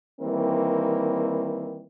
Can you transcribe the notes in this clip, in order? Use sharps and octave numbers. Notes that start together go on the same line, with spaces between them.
D#3 E3 G3 A#3 C4